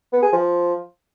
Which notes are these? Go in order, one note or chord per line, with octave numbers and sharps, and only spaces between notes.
B3
G#4
F3